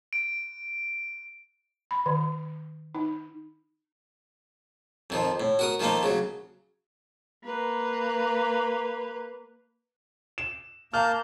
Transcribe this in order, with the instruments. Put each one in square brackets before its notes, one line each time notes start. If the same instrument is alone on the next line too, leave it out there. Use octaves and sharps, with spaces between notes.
[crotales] D7
[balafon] B5
D#3
D#4
[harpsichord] F2 D#3 F3
A2
F#4 A#4 D#6
D#3 F3 A3 A#3 D#4
C#3 F#3
[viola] A#3 B4
[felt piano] E7
[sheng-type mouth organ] A#3 A5 G6 [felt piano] F6